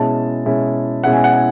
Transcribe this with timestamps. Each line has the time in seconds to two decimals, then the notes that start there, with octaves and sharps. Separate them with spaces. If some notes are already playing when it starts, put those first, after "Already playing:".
Already playing: B2 G#3 C#4 E4 A5
0.46 B2 G#3 C#4 E4
1.04 B2 G#3 C#4 E4 F#5
1.13 G#5
1.24 F#5
1.33 G#5